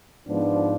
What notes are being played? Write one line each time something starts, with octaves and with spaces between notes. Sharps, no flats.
G#2 F3 B3 D4